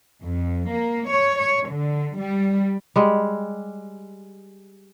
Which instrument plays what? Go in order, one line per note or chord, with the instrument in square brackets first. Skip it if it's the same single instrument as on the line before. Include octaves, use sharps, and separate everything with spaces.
[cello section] F2
A#3
C#5
C#5
D3
G3
[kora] G3 G#3